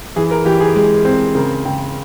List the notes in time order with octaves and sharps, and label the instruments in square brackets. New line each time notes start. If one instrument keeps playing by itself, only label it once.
[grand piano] E3 G#4
A#4
E3 G4
G#4
G#3
C4
C#3 A#4
C#3 G5